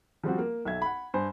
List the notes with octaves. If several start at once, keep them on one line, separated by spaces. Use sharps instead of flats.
F3 G3 C4 F#4
A#3
B1 E5 G#6
F#5 B5
G2 C5 G#5